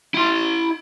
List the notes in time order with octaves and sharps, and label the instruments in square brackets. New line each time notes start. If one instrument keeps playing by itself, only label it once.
[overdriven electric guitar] E4 C6